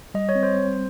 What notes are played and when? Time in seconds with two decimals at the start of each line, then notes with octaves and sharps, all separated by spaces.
0.14 G3 D#5
0.29 C#5
0.35 C4
0.43 C5
0.57 C4